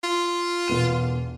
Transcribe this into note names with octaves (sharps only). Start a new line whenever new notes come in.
F4
E1 B3 D#7